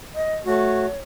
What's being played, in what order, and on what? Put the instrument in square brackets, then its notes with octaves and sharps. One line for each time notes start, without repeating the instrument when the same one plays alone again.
[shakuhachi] D#5
[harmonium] A3 F#4 [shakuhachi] C#5